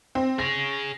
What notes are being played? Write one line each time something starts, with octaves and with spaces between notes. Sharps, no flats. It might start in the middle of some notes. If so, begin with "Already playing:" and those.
C4
G#4 C#5 A#6